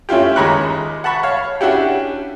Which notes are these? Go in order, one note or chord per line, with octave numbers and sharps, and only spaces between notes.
A3 C#4 E4 F4 G4
D#2 G#3 A#5 B5 C#6 F#6
F#5 A5 B5 C#6
C#5 F5
C#4 D4 E4 F#4 G4